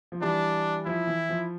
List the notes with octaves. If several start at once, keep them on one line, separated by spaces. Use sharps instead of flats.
F3
E3 G3 D4
F3 E4
E3
F3